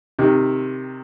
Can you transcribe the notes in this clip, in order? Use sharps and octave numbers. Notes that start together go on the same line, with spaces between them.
C3 D#3